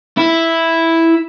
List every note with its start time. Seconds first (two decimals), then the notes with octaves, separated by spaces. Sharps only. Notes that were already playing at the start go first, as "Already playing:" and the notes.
0.18 E4